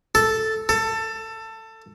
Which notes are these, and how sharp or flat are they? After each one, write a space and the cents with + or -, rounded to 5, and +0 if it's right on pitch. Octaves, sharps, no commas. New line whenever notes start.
A4 +0
A4 +20